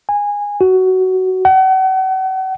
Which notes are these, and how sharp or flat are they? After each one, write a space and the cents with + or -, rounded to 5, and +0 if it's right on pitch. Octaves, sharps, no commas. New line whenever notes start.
G#5 -15
F#4 +15
F#5 +40